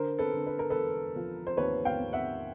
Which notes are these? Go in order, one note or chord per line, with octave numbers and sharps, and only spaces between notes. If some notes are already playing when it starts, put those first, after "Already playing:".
Already playing: D3 A#4 C5
A4 B4
D3
B4
A#4
E1 A4 B4
F3
C5
D#2 B4 C#5
F5 G5
D#2
E5 F#5